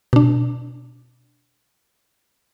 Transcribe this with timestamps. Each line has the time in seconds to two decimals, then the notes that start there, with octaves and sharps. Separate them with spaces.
0.13 B2 D4